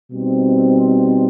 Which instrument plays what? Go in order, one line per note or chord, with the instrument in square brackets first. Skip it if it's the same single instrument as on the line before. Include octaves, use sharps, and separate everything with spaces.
[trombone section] B2 G3 C4 D#4